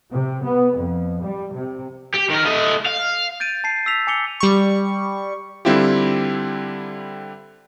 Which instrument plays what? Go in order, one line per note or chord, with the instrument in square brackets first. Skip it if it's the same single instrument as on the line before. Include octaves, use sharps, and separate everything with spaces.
[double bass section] C3
B3
F2
G3
C3
[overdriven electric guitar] G4
D#3 A#4
A3 D#5
F5
[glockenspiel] G6 A6 D7 D#7
A5 C7
E6 B6 F7
G#5 D6 C#7 F7 G7
[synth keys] G3 C#6
[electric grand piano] D3 G3 C4 E4 F4 G4